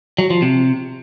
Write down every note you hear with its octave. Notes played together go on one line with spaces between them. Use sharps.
F#3
F3
C3